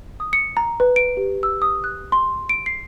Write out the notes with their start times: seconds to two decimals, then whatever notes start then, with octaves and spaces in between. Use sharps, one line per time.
0.20 D#6
0.33 C#7
0.57 A#5
0.80 B4
0.96 D7
1.17 G4
1.43 E6
1.62 D#6
1.84 F#6
2.12 C6
2.49 D7
2.66 C7